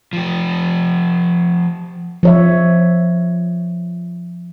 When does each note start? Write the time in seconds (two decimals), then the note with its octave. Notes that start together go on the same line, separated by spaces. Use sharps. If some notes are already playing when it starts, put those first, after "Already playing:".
0.13 F3 G4
2.23 F3 C#5 E5